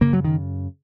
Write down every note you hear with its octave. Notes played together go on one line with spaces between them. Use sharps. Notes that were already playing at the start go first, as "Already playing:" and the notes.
F#2 C#3 A#3
F#3
D#3